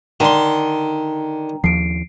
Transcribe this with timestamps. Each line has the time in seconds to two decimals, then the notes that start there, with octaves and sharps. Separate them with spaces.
0.20 D3 D#3 G5 A#5 C6
1.64 D#2 F3 C7 D7